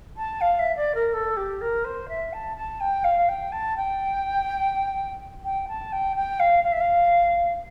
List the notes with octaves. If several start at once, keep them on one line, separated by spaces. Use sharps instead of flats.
A5
F5
E5
D5
A#4
A4
G4
A#4
C5
E5
A5
A5
G5
F5
G5
A5
G5
G5
A5
G5
G5
F5
F5
E5
F5